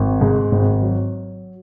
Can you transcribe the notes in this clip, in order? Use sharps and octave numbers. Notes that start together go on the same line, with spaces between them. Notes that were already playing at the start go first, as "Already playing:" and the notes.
Already playing: G#1
G#2
G#1
F#3